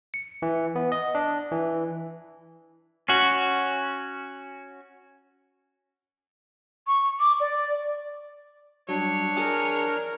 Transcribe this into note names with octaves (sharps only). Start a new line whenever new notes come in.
C#7
E3
B3
D#5
D4
E3
C#4 F#4
C#6
D6
D5
G2 F#3 D4 C#5
G#4 A#4